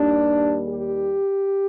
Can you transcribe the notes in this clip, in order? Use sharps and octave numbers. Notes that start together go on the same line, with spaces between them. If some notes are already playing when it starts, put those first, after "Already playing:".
Already playing: D#2 D#3 G3 D4
G4